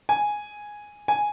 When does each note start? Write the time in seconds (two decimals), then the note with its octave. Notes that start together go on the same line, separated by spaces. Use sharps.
0.09 G#5
1.08 G#5